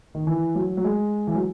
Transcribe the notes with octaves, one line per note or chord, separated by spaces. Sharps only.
D#3
E3
F#3
F#3
G#3
E3
F#3